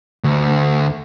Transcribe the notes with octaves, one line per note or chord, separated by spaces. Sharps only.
D2